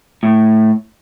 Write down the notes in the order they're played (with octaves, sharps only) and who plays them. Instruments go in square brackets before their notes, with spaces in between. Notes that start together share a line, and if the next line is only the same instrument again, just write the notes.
[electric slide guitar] A2